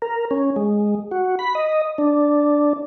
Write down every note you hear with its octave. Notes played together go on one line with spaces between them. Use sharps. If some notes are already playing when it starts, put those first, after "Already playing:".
A#4
C#4
G#3
F#4
B5
D#5
D4